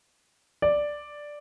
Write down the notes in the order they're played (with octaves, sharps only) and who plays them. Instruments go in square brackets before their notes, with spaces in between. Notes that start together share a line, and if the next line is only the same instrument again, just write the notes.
[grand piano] D5